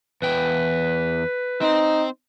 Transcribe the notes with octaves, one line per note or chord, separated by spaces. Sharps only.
E2 B4 G5
C4 D#4 C5